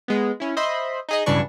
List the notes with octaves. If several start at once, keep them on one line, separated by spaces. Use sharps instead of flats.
G#3 B3
C#4 E4
C5 D#5 E5 B5 C6
D#4 G#4 D#5
B1 G2 C#3 E3 D4 C#6